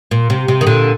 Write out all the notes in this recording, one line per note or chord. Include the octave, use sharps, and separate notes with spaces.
A#2
C3
C3
D#3
A#2 D3